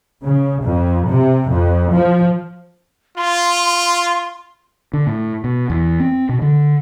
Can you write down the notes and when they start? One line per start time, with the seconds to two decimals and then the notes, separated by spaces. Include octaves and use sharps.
0.25 C#3
0.63 F2
1.09 C3
1.50 F2
1.95 F3
3.17 F4 C6
4.93 D3
5.07 A2
5.44 B2
5.70 E2
6.00 C4
6.29 B2
6.42 D3